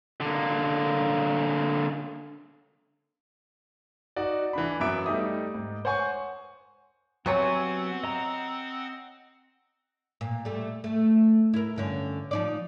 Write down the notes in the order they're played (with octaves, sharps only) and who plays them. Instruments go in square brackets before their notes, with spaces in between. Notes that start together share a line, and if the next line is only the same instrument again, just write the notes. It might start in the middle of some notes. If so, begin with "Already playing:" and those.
[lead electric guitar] D3 A#3
[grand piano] D#4 F#4 D5
E3 D4 B5
F#2 F#3 B3 E5 D6 D7
G3 A3 D#4 D6 D#6
G#2
C5 C#5 F#5 G#5 C#6
[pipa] C3 C#5 [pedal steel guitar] F#3 B3 G#5 [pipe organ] C4 F#5
[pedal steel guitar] D#5 A#5
[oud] A#2
G3 A3
A3
E4 A#4
G2 D3 C#4
F3 D#4 D5